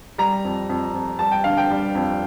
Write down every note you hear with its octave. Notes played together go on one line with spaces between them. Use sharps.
G3 A#5
F2
F2
F2
G3 A5
G5
D3 F5
G5
G3
F2